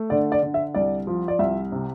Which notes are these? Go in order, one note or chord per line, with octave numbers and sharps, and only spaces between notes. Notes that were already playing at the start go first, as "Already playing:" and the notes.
Already playing: A3
D3 D5
D5
D3
E5
C2 D5
F3
D5
C2 E5
C3